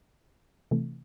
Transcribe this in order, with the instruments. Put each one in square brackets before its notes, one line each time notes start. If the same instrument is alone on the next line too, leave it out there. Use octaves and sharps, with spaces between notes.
[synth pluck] C3 E3 A3